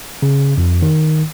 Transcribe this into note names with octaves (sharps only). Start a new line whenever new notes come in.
C#3
F2
D#3